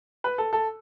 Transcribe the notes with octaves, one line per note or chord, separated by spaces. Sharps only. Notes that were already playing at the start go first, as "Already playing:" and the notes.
B4
A4
A4